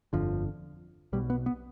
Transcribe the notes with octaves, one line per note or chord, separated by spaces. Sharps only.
G1 F2 D3 F3
B1 B2 G3
B3
B3